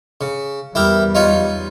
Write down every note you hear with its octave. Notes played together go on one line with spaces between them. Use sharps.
C#3
E2 G3 E4 G4 A#4
D#4 F4 C#5